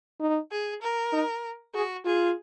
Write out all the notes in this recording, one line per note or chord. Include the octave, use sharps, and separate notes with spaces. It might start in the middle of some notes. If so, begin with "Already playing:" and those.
D#4
G#4
A#4
D#4
F#4 G#4
F4 G#4